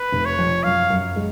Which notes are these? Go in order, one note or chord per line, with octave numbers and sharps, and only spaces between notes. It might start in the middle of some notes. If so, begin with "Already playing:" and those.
Already playing: B4
F1
C#5
F2
F#2 F5
F#2
G#3